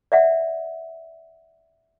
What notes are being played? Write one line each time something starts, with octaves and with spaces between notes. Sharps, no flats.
D5 E5 F#5